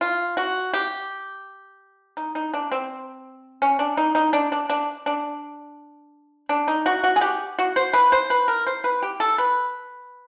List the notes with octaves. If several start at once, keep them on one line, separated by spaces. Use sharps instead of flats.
F4
F#4
G4
D#4
D#4
D4
C4
C#4
D4
D#4
D#4
D4
D4
D4
D4
D4
D#4
F#4
F#4
G#4
G4
F#4
C5
B4
C5
B4
A#4
C5
B4
G4
A4
B4